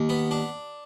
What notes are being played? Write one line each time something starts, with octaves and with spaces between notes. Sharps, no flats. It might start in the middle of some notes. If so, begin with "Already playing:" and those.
Already playing: D#2
B3
D4